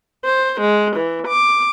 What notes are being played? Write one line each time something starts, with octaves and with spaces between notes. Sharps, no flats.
C5
G#3
E3
D6